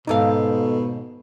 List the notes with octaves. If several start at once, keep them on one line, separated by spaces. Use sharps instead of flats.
D#2 G#2 B2 D#4 A4 F5